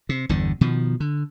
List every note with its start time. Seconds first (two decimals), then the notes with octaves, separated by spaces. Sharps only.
0.09 C3
0.29 G1 E2 D3
0.61 B2 D#3 F3
1.00 D3